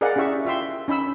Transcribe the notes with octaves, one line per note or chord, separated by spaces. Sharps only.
G#4 A#4 D5 D#5 F5 F#5
C#4 E4 G4 E5 C#6
F4 E5 G5 C6
C#4 D#4 B5 E6